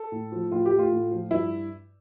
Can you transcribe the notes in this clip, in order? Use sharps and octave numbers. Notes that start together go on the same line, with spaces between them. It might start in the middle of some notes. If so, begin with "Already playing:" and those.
Already playing: A4
A2
F3
A2 F4
G4
A3
F4
A2
F3
G2 E4